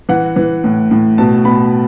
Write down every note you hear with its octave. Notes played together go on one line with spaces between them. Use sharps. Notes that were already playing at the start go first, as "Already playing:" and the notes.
E3 F#5
E3
A2
A2
B2 A5
B2 B5